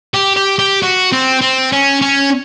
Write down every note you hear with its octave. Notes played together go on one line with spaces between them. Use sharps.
G4
G4
G4
F#4
C4
C4
C#4
C#4